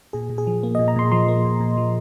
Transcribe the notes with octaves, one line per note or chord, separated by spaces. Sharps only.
A#2 G#4
A#2
G#4
F3
A#3
A#2 D#5
A#5
A#2 C6
F3 C6
A#3
A#2
A#2
F3